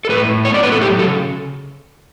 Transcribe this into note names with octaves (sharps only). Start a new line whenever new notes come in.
A4
A2 B4
A2
B3 C#5
D5
A2 B4
A4
F#3 G4
C#3 A4